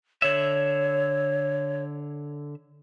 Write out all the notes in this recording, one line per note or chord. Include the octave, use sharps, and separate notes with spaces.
D3 C#5 E5